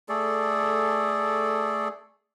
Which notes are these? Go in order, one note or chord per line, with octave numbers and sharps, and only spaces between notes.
A3 G#4 A4 D5